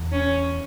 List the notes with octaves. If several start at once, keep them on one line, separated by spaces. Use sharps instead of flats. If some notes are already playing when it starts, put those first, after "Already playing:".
Already playing: E2
C#4